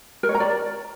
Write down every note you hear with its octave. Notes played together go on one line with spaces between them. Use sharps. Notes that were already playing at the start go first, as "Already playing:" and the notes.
A#4
C#5
A#5
D5